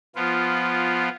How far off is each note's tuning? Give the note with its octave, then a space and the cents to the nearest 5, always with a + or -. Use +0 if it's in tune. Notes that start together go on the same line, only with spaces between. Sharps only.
F3 +0 B3 +0 F4 -10